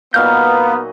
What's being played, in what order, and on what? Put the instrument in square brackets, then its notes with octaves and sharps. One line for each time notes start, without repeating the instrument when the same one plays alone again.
[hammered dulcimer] A#2 F#3 D#4 [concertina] A#3 [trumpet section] B3 [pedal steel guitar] F6 G6